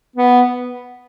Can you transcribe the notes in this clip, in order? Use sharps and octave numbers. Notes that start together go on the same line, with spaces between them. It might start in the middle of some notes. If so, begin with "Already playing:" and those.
B3